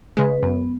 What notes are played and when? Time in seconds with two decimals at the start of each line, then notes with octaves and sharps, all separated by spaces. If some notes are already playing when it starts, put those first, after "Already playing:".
0.17 C#3 G#3 B4
0.43 F#2 B3